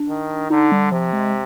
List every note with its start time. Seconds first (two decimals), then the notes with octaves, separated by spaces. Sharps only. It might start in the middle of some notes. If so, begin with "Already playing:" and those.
Already playing: D4
0.09 D#3
0.50 D3 D#4
0.72 G3
0.91 C3 F3
1.13 G#3